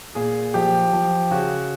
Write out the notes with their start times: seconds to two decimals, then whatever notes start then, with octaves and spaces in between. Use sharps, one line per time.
0.15 A#2 G#4
0.54 F3 G4
0.93 F3
1.31 C#3 F#4